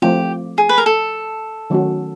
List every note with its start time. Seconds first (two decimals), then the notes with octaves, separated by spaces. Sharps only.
0.02 F3 A3 C4 F4 G4
0.58 G#4
0.69 B4
0.78 A#4
0.86 A4
1.70 D#3 F#3 A3 C#4 F#4